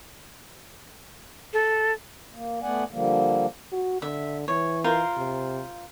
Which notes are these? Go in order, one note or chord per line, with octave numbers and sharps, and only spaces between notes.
A4
A#3
A3 B3 D5 F#5 G#5
D3 F3 G3 A#3
F#4
D3 E5
E3 C#5
F4 A#4 C5
C3